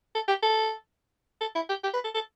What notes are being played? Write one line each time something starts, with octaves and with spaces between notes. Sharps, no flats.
A4
G4
A4
A4
E4
G4
G4
B4
A4
A4